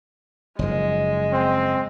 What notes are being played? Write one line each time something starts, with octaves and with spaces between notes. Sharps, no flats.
F#1 G#2 F3 G#3
C4